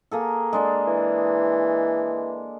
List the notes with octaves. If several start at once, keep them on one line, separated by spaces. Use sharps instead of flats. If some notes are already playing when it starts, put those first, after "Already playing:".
A#3 G#4 A4
G#3 D4 D5
E3